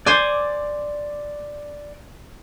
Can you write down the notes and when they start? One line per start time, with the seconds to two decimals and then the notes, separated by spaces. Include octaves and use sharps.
0.06 C5 D5 G#5 D6